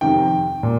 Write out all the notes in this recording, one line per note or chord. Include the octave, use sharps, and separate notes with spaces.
F2 C3 D#3 G5
A#2